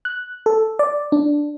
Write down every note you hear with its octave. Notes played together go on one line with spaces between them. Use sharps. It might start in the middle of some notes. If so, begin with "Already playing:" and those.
F#6
A4
D5
D4